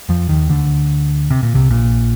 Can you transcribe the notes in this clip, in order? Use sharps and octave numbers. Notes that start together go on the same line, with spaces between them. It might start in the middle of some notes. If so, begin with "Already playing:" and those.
F2 F3
D#2 D#3
D2 D3
C3
A#2
C2 C3
A#1 A#2